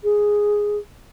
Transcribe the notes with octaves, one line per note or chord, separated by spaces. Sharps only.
G#4